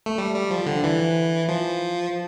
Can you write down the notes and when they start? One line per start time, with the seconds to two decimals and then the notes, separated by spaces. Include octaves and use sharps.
0.06 A3
0.18 G3
0.34 G3
0.51 F3
0.66 D3
0.84 E3
1.49 F3